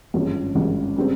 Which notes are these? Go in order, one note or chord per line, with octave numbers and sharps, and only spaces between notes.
G#1 G2 F3 G#3 C#4
G#1 G2 F3 G#3 C#4
C#3 G3 C4